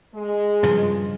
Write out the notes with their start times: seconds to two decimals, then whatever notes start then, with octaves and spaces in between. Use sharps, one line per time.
0.15 G#3
0.63 G2 C#3 F3